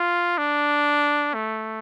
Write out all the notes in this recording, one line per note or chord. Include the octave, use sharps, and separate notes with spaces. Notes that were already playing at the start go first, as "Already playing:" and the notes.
Already playing: F4
D4
A3